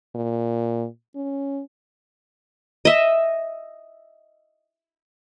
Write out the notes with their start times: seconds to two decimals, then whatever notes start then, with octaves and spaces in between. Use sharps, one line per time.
0.15 A#2
1.16 C#4
2.85 D#5 E5